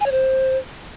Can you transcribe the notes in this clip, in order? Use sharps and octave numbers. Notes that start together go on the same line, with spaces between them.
G#5
C#5
C5